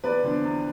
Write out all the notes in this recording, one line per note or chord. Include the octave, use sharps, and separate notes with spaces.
E2 B4 D5
D3 F3 B3 D4
E2